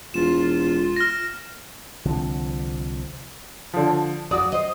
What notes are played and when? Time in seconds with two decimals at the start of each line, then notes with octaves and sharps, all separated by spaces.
0.14 E1 F4 E7
0.96 F6 A#6
2.06 C2 D3 F3 C4
3.74 D3 F3
4.31 F#2 F#4 D5 D#6
4.53 C5 D#5